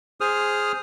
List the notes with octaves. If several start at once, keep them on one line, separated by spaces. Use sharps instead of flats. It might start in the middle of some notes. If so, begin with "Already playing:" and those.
G#4 C5 D#6 F6